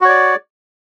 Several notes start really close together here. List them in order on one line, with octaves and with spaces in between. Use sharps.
F#4 C#5 D5